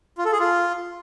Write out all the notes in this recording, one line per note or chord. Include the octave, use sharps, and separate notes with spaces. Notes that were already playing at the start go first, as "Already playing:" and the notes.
F4
A4
G#4
F4